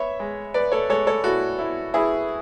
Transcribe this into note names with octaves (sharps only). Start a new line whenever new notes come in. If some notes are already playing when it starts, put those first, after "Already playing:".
Already playing: B3 C#5 E5
G#3
B3 B4 D5
A4 C#5
G#3 A4 C#5
A4 C#5
E4 F#4 A4
E4
B3 E4 G#4